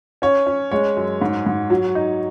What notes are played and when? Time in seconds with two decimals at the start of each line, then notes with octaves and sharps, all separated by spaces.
0.22 C#4 C#5
0.47 C#4
0.71 G#3 C#5
0.97 F#2
1.21 G#2
1.46 G#2
1.70 F#3
1.95 D#4